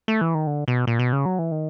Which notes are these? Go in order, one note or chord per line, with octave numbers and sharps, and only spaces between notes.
A3
E3
D#3
D3
B2
A#2
B2
C#3
F#3
E3
D#3